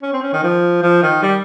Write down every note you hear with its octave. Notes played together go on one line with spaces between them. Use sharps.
C#4
C4
C#4
D#3
F3
F3
D#3
G3